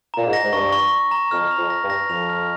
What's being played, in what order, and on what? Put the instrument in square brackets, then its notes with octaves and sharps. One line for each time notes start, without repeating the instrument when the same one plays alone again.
[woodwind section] A#2 [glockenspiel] A#5
[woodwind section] G#2
[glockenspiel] A#6
[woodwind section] G#2
[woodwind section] G2 [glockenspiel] C#6
[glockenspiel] C#6
C#6
A#5
[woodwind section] F2 [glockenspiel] F6
[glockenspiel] F7
[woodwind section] F2
[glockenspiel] A#6
[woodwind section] G2
[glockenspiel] A#6
[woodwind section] F2 [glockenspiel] F7
[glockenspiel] F6